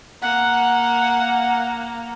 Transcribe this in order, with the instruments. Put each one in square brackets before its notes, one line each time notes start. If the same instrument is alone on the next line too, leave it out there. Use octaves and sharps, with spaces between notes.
[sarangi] A#3 [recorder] F#5